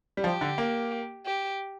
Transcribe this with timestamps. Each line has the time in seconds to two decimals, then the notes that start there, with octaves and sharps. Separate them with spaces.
0.17 G3
0.24 F3 G4
0.41 D3
0.58 A#3
1.26 G4